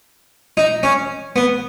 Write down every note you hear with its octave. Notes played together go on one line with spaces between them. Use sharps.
D#4
C#4
B3